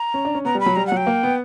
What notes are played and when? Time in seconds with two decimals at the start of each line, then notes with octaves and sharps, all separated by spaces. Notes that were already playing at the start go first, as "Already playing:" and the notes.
Already playing: A#5
0.14 C#4
0.25 D4
0.34 C#4
0.45 B3 A#5
0.55 G3
0.60 B5
0.66 F#3
0.76 G3 A#5
0.87 F#5
0.92 F#3
0.97 G5
1.07 A#3
1.23 B3